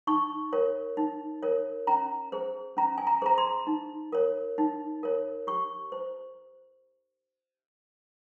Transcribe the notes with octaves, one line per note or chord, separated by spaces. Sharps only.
D#4 C#6
A#4 C#5
D#4
A#4 C#5
C#4 A#5
G#4 C5
C#4 A#5
G#5
A#5
G#4 C5 A#5
C6
D#4
A#4 C#5
D#4
A#4 C#5
G4 C#6
C5